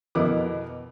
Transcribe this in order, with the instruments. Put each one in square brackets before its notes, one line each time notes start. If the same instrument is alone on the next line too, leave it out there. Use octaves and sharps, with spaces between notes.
[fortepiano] F2 B2 B3 E4 A#4 D6